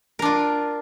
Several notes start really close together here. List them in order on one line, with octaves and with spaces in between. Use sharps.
A#4 D4 F4